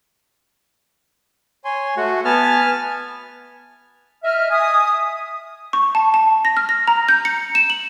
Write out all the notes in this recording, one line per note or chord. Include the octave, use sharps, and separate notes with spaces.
C#5 G#5 C6
A3 F#4
B3 G#5 A5 F6
D#5 E5 F6
E5 G#5 D#6
C#6
A5
A5
A#6
F6
A#6
A#5
G6
C#7
E7
F#7